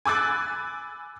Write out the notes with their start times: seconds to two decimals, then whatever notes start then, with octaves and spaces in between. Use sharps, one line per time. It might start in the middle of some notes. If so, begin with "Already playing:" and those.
0.05 G#5 B5 D6 E6 F#6 A6